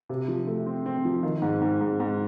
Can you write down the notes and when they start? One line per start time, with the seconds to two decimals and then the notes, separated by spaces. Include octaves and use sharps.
0.09 C3
0.28 F3
0.47 A3
0.66 C4
0.86 C4
1.05 F3
1.23 D#3
1.42 G#2
1.62 G#2
1.81 G#2
2.00 G#2